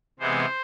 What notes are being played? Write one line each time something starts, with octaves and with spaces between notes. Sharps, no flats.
C3 E3 G#3 B3 C5